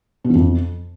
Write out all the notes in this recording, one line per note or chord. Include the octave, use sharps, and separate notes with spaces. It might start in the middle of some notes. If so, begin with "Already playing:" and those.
B2
E3
F2